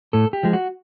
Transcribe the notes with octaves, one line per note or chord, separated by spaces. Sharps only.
A2 A4
G4
F3 G#3
F#4